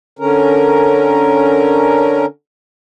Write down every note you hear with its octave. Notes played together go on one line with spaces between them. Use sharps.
D3 C#4 A#4